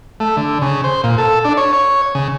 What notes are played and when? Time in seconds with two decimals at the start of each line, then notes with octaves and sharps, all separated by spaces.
0.20 A3
0.37 D3
0.62 C#3
0.84 C5
1.04 A#2
1.18 A4
1.45 D4
1.57 C#5
1.73 C#5
2.15 C#3